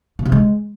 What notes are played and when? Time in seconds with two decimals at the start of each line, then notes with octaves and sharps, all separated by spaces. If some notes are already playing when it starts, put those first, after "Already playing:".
0.19 B2
0.25 C3
0.32 G#3